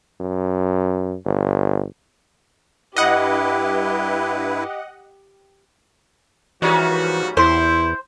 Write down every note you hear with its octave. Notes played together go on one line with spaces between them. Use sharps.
F#2
G1
G2 E4 G4 B4 D#5 F#5
G#2 E3 F3 G3 A#3 C#4 F#4
E2 E4 C5